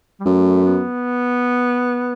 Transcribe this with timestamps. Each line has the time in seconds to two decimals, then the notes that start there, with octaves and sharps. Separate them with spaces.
0.20 G3
0.26 F#2 A3
0.66 B3